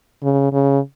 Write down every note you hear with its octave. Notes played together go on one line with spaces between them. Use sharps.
C#3
C#3